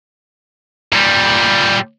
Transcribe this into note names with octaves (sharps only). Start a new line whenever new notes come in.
A#2 G3